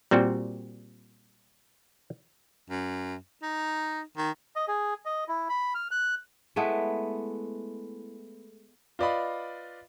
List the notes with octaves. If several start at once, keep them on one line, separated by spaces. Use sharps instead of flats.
A#2 G3 C4 F#4
F#2
D#4
D#3
D#5
G#4
D#5
E4
B5
F6
F#6
G#3 A3 B3 E4
F4 B4 D5 D#5 F5 B5